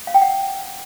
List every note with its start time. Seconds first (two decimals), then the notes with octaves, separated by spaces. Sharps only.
0.07 F5
0.14 G5
0.21 F#5